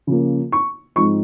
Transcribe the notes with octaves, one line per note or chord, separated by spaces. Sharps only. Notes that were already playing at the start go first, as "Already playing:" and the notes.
C#3 F3 A#3
C#6
G#2 F3 G#3 C4 D#4 C#6